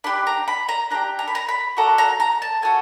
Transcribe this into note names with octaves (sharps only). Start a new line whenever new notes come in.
D4 G4 B5
A#5
B5
A#5
D4 G4 A#5
A#5
B5
A#5
B5
D4 F#4 A4 A#5
A#5
A#5
A5
F#4 A4 G#5